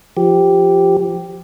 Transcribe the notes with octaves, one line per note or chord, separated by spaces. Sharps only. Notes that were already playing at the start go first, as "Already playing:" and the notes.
F3 G4